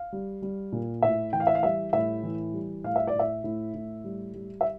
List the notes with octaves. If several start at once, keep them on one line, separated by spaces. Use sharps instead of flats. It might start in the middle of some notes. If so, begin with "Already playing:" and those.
Already playing: F5
G3
G3
A#2
A2 E5
E3 G5
F5
E5
F5
G3 E5
A2 E5
E3
G3
A2 F5
E5
D5
A2
E5
A2
A2
G3
G3
E5